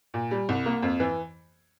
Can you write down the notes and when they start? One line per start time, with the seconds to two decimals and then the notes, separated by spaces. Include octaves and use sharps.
0.14 A#2
0.31 G3
0.49 C2
0.66 A#3
0.83 F2
1.00 E3